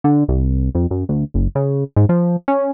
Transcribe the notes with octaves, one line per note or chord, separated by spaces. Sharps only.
D3
C2
F2
F#2
D2
F#1
C#3
G#2
F3
C#4